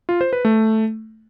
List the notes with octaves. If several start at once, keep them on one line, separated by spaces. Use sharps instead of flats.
F4
C5
B4
A3